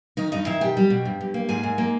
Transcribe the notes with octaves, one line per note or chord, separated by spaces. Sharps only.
D#3 D#4 D#5
G2 D#4 D#5
D#3 E4 E5
B2 G4 G5
G3
B2
G2
G2
A#3
G#2 G#4 G#5
G#2
A#3